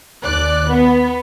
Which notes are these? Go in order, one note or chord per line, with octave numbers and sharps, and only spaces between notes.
D#2 D5 F#6
B3